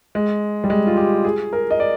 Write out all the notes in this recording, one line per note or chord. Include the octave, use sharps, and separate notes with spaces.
G#3
G3
G#3
F4
G4
G#4
A#4
D#5
D5